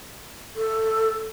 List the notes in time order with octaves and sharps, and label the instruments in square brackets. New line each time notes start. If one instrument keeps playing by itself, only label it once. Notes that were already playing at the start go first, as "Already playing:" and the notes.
[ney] A4